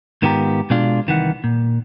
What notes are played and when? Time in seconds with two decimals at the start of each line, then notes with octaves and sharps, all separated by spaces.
0.22 G#2 D#3 B3 F4 G4 A#5
0.70 B2 G#3 D4 F4
1.07 C2 D#3 E3 F#5
1.44 A#2